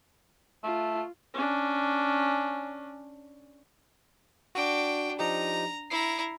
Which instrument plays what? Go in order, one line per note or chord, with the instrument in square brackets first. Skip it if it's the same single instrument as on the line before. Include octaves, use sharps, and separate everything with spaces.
[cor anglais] A3 [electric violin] F4
[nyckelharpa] C#4 D4
[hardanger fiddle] D4 G5 [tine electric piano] F#4 D6
[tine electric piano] F3 D#4 G4 [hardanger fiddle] A#5
[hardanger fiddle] E4 A#5 [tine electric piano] C7